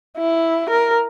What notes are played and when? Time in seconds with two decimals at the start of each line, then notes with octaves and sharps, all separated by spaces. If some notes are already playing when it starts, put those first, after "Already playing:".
0.17 E4
0.70 A#4